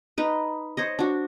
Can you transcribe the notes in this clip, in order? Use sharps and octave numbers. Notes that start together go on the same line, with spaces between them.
D#4 B4
C5 C#5 D#5
D4 F#4